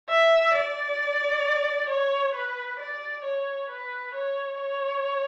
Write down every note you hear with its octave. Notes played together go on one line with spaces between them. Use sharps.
E5
D5
C#5
B4
D5
C#5
B4
C#5
C#5